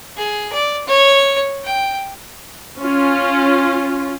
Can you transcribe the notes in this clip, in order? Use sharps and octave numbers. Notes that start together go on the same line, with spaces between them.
G#4
D5
C#5
G5
C#4 F4